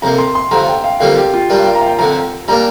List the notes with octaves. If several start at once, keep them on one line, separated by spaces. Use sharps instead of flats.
F2 C3 A#3 A#5
C6
C6
G2 D3 F3 A#5
G5
F5
F2 D3 G3 A#3 F4 F5
G4
F4
G2 G3 D4 A#4
G5
A#5
F5
G5
F2 D3 F3 A#5
G3 A#3 D4 A#4 A#5